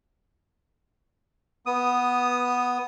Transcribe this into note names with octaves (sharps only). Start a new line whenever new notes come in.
B3 D#6